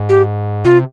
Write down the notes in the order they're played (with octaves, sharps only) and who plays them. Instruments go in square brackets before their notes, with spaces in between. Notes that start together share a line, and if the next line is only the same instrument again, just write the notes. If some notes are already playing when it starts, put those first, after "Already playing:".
Already playing: [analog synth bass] G#2
[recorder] G4
[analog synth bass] C3 [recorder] F4